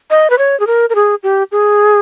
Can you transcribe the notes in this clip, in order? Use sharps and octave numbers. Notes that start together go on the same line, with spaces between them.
D#5
B4
C#5
G#4
A#4
A#4
G#4
G4
G#4